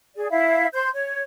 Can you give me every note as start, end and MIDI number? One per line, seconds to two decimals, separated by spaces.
0.15 0.28 68
0.15 0.28 74
0.30 0.66 64
0.30 0.66 76
0.30 0.66 77
0.73 0.89 72
0.73 0.89 84
0.73 0.89 91
0.93 1.22 73